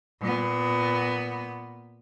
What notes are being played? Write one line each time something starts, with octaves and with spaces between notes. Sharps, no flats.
A#2 B3